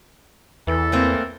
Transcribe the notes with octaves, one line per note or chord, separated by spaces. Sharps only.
E2 E3 A4
A3 A#3 C4